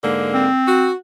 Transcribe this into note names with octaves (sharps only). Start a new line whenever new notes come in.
G#2 D3 A#3
C4
F#4